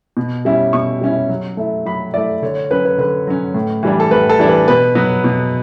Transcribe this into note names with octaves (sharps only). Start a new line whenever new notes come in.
B2
G3 C#4 E4
B2 C#6
G3 C#4 E4
F#3
A3 E4
F#3 B5
A3 E4 D5
D3 C#5
C#5
F#3 C#4 B4
B4
D3 B4
F#3 C#4
A2
E3 G3 D4
A4
A2 B4
A4
E3 G3 D4
B4
B2 B4
F#3 B3
B2